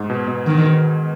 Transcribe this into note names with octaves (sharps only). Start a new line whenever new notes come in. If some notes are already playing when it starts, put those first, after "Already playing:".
Already playing: G#2
B2
B2
D#3